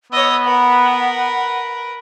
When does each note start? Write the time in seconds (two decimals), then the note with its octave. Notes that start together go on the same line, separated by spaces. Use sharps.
0.12 B3 C#5 D#5 E6
0.45 A#4 B4 F#5